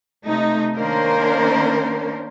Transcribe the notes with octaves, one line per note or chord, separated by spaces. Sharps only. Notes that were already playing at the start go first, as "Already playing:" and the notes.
C3 A3 D#4
D#3 A#3 C#4 D4 A#4 C5